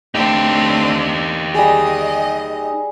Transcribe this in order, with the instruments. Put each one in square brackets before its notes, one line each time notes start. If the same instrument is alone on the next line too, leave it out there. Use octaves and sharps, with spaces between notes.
[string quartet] A3 C4 D4 [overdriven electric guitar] D#4 G4 [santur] G5
[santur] G3 G#4 [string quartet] D#5